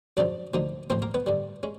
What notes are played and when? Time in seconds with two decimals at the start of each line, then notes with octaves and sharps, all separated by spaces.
0.17 F#2 C#3 F3 D4 D5
0.54 D2 D3 F3 A#3 D#4
0.90 A1 A2 F3 A#3 C4 C5
1.02 A#3 A#4
1.14 B3 B4
1.26 G2 D3 G3
1.63 G#3 C#4